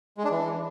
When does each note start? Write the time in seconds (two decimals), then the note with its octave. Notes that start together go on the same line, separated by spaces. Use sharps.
0.18 G#3
0.24 D4
0.31 E3